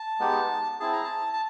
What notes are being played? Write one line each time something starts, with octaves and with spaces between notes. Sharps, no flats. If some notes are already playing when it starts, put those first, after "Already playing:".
Already playing: A5
G#3 B3 D#4 G4
C4 E4 G#4 A5
A#5
A5
A5